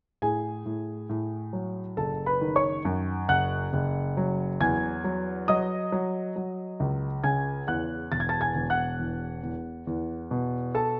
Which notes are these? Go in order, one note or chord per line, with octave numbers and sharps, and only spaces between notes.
A2 G#4 G#5
A2
A2
F#3
F#1 A4 A5
B4 B5
D#3
C#5 C#6
F#2
F#1 F#5 F#6
F#1
F#3
E2 G#5 G#6
F#3
F#3 D#5 D#6
F#3
F#3
C#2
C#3 G#5 G#6
E2 F#5 F#6
E1 A6
G#6
A5 A6
G#5 G#6
E1
F#5 F#6
E2
E2
E2
B2
A4 A5